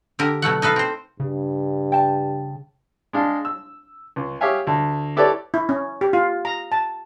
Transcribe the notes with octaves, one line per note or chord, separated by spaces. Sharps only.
D3 G4 A#4
B2 F#3 A3 F#5
D#4 A4 B4 F5
C4 C5
G2 C#3
G5 A5
G#3 D4 F5
E6
C#2
G4 G#4 C#5 E5 F5 G#5
D2
E4 G4 A4 B4 C#5 D5
E4
C#4
G4
F4
A#5
A5